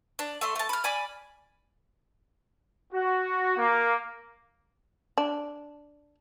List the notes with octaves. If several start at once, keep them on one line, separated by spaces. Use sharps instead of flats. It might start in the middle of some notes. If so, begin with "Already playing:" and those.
D4
A3 E5 C6
A3 A5
B5 F6
D5 G#5 B5 D6
F#4
A#3
D4